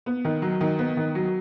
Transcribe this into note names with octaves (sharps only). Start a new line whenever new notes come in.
B3
D#3
F#3
D#3
B3
D#3
F#3